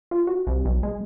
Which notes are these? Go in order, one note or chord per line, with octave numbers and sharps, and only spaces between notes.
F4
F#4
C2
B1
G#3